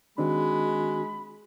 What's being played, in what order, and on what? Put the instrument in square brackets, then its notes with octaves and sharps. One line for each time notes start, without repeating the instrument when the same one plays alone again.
[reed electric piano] D#3 C4 D4 [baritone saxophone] G#3 [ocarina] F#4 [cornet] B5